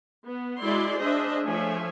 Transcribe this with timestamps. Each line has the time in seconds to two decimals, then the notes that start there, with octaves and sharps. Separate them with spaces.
0.24 B3
0.61 G#3 E4 F#4 D5 C6
1.01 D4 G#4 C5 D#5 E5
1.43 F3 A3 C#5 E5 G#5